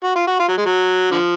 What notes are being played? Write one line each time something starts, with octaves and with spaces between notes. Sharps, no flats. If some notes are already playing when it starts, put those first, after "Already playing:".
F#4
F4
F#4
F4
F#3
G#3
F#3
D3 F3